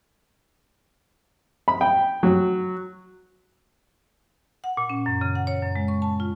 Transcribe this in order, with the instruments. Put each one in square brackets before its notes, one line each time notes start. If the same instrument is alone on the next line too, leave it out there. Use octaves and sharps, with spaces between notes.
[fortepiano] B5
G5
F#3
[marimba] F#5
A#2
C#4
F#2
C#3
F#5
C#5
F#2
G#3
C#6
A5
F4